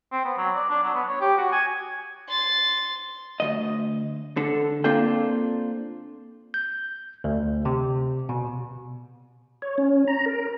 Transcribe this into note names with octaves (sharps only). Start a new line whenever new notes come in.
C4
B3
F#3
D5
D4
F#3
B3
C#5
G4
F#4
G#5
C6 A6
D2 D#3 D#5
D3 A4
A#3 C4 D4 F4 A4 G5
G6
D2
C3
B2
C#5
C#4
A#5
A#4